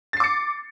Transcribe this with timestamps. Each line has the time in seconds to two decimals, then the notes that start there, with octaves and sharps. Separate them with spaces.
0.13 A6
0.17 C7
0.20 D6
0.24 C#7